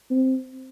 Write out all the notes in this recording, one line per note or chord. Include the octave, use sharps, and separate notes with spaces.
C4